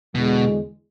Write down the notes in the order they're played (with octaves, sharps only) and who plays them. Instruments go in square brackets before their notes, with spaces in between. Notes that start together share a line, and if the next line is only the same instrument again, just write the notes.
[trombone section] E2 D3 G#3 [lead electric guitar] B2